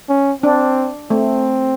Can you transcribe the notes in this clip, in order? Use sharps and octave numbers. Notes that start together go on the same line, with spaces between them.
C#4
C4 D4
A3 C4